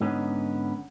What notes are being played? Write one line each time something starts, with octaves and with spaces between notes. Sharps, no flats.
G#2 D3 B3 C#4 D#4